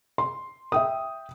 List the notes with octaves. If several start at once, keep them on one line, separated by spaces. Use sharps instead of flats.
C6
E5 G5 D#6